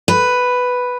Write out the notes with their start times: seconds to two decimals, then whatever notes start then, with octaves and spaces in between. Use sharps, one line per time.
0.08 B4